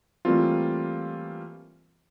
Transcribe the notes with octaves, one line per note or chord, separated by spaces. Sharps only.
E3 G3 A3 A#3 C4 F4